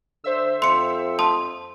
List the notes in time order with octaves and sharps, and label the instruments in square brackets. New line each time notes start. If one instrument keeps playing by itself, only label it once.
[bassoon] D3 [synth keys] C5 E5 E6
[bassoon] F2 [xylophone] C6 C#7
[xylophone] A5 C6 D#6